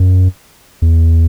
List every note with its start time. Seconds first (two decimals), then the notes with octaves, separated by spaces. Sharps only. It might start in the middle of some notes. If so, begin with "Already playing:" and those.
Already playing: F#2
0.82 E2